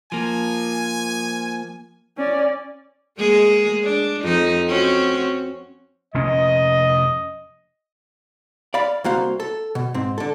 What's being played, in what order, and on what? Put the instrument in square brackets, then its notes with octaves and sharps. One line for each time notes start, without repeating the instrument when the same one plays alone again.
[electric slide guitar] F3 A#3 [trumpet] G#5
[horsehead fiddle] C#4 D5
[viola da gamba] G#3 A#3 G#4
D4
F2 D#4
C4 C#4 F#4
[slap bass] F1 A#2 C#4 [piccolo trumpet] D#5
[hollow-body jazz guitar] D5 F5 B5
C2 C3 A#3 F#4 C5 F5
A4
B2
G#2 C4
D3 A4